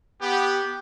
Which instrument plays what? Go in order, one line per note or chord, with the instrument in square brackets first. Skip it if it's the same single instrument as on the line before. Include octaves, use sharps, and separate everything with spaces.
[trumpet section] B3 G4